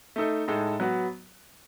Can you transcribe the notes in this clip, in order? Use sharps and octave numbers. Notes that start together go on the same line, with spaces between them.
A3 D#4 A4
A2 G#3 D#4 A4
F#3 B3 F#4